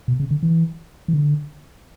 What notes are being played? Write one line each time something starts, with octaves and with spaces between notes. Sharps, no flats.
B2
C#3
D3
E3
E3
D3